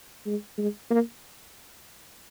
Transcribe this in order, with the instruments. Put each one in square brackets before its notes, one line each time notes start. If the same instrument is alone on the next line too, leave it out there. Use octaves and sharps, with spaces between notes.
[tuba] G#3
G#3
A#3